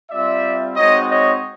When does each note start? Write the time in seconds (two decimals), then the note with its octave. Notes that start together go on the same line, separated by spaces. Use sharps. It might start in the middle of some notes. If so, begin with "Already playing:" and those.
0.10 G3 C4 F4 D5 E5
0.76 G#3 C4 D#4 F#4 C#5 D#5
1.08 C#5 D#5